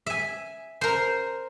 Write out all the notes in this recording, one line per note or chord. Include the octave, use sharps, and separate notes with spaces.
E5 G#5
A#4 C5